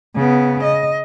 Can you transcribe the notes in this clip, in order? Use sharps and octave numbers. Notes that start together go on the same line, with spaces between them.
C#3 B3
D#5